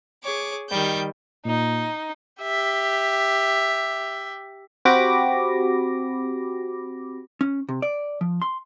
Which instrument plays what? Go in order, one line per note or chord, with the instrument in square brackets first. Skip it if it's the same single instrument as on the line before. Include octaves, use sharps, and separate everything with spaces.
[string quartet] G#4 C#5 D6
D#3 G3 G6
[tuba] A#2 [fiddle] D#4
[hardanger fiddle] G4 E5
[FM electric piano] C4 F#4 G4 B5 D6 A#6
[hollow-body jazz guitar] C#4
C3
D5
F3
C6